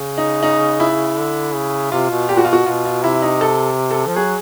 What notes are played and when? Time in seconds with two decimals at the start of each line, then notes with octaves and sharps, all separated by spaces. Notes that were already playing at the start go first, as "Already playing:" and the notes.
Already playing: C#3
0.18 D#4
0.43 D#4
0.80 E4
1.17 D3
1.54 C#3
1.92 C3 F4
2.10 B2
2.29 A#2 G4
2.37 F#4
2.45 F4
2.48 B2
2.53 F#4
2.66 B2 F4
2.85 F4
3.03 C3 E4
3.22 D#4
3.41 A4
3.91 A4
4.07 F3
4.16 F#3 G#4